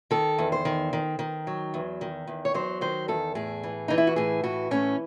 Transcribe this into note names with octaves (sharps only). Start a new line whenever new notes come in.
D#3 A4
E2
C5
D#3
D#3
D#3
F#3
E2
D#3
E2
C#5
F#3 C5
D#3 C5
E2 A4
A2 G#4
E3
E3 D#4
E4
F#4
A2 G#4
E3 F#4
A2 C#4